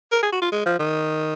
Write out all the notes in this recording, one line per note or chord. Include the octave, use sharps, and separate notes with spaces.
A#4
G#4
F#4
F4
G#3
F3
D#3